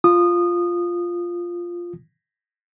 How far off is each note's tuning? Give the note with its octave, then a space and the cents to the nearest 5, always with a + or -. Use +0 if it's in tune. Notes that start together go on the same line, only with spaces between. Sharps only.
F4 +0 D#6 -20